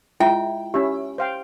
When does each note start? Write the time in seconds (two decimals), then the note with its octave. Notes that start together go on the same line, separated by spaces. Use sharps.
0.20 G#3 E4 F4 E5 G5
0.74 C#4 E4 G4 E5
1.18 C5 F5 G5